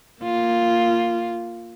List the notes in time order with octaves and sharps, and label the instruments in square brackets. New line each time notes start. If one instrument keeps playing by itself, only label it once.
[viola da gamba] A#3 F4